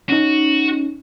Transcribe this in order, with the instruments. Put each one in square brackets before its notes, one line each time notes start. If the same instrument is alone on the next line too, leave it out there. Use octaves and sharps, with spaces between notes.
[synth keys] C#4 D#4 [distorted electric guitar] F#4